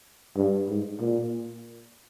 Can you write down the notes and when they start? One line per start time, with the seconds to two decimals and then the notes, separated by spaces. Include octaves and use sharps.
0.36 G2
0.69 G#2
1.00 A#2